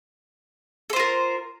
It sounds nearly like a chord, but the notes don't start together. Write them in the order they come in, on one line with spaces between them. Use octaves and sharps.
A4 C5 F4 A#4